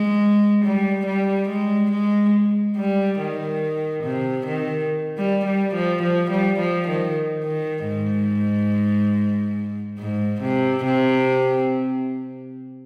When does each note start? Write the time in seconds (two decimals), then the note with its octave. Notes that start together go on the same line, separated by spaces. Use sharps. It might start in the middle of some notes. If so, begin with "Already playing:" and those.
Already playing: G#3
0.64 G3
1.06 G3
1.49 G#3
1.92 G#3
2.77 G3
3.20 D#3
4.04 C3
4.46 D#3
5.18 G3
5.45 G3
5.74 F3
6.03 F3
6.31 G3
6.59 F3
6.88 D#3
7.44 D#3
7.87 G#2
9.99 G#2
10.42 C3
10.85 C3